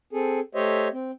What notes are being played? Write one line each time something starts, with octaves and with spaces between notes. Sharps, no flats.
C4 G#4 A4
A3 G4 C5 C#5 D#5 E5
C4